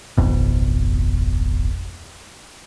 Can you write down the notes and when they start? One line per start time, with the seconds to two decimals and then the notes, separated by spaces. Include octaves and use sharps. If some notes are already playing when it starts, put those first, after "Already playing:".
0.17 D1 G#1 F2 B2